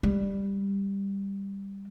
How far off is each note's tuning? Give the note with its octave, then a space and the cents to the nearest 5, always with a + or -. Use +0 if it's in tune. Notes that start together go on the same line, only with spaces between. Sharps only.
G3 +10